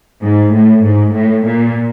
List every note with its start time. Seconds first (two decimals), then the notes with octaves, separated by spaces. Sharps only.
0.22 G#2
0.52 A2
0.83 G#2
1.12 A2
1.43 A#2